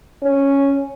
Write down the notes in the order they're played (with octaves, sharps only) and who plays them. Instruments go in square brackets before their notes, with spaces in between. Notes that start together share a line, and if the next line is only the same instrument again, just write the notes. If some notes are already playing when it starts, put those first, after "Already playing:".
[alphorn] C#4